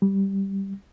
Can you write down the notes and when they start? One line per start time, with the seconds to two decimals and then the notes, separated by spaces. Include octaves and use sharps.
0.02 G3